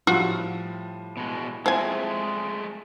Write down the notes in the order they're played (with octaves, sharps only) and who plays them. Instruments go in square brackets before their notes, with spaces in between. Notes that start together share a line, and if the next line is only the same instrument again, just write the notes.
[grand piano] A2 F3 G3 [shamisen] F4 F#4
[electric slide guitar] B2 G#3
[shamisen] F3 G#5 [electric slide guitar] G#3 A3 G#4 [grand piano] C4 E4